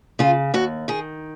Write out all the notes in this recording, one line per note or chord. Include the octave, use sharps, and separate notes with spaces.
C#3 F4
D#2 F#4
D#3 G#4